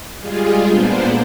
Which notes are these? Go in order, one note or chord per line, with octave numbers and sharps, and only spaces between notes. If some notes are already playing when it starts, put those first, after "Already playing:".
G3 G#3 F4 G#4
A#2 A#3 B3 D4 C5